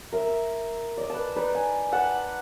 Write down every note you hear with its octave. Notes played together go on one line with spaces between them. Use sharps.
A#4 E5
D5 D#5
B4 A5
D#4 B4 D5
G#5
F#5 A5